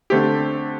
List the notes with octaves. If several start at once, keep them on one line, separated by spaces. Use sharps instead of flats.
D3 A3 C4 G4